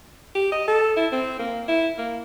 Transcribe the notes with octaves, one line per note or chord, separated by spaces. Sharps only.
G4
D#5
A4
E4
C4
A#3
E4
A#3